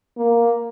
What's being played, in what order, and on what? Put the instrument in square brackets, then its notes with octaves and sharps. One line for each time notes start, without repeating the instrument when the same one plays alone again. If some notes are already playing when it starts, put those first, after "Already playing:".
[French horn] A#3